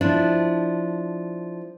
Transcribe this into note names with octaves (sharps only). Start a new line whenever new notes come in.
F3 D4 E4